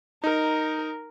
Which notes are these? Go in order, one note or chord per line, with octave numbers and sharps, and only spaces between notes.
D#4 A#4